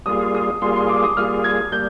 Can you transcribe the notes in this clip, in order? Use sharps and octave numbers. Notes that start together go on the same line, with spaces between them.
G3 A#3 F4 G#4 D#6
D#6
G3 A#3 F4 G#4 C6
C6
D6
D#6
G3 A#3 F4 G#4 F6
G#6
G3 A#3 G6